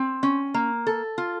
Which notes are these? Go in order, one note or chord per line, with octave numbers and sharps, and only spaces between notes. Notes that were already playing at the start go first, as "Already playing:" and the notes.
Already playing: C4
C#4
A#3
A4
F4